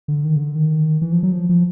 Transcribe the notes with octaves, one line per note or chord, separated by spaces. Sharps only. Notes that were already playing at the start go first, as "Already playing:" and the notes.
D3
D#3
C#3
D3
D#3
E3
F3
F#3
F3
F3